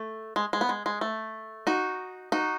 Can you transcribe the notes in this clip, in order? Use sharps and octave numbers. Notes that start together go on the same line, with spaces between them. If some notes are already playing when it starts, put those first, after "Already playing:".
Already playing: A3
G#3
G#3
B3
G#3
G#3
A3
D#4 F#4
D#4 F#4